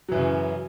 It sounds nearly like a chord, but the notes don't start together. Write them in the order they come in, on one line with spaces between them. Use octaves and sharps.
F#3 E3 F#2 C#3